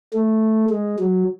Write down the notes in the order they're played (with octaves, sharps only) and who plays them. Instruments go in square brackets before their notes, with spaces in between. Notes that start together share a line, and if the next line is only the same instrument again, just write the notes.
[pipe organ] A3
G#3
F#3